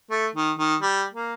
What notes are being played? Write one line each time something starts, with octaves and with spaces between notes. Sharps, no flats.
A3
D#3
D#3
G3
A#3